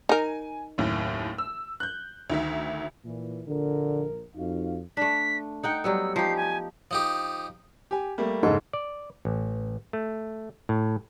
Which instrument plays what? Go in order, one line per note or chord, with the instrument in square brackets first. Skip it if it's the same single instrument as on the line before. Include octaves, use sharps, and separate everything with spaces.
[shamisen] D#4 A#4 [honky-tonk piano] G#5
[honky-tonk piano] F#1 D#2 A2
E6
F#6 G6
D2 D#3 E5
[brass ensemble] A#2 E3
[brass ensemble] A#1 A#4 [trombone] D3
[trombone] F2 [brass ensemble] D#4 F#4 F5
[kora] A3 D4 [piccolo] B6
[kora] D#4 F#5 G5 [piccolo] C#7
[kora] F#3 G3 B3 [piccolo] E6
[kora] F3 D#4 G4 [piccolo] C7
[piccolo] G#5
[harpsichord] F3 D#4 G4
[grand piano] G4 G#5
G3 A3 A#3
[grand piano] F#1 C#3 A4 [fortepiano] G#2
[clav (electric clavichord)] D5
A1
A3
A2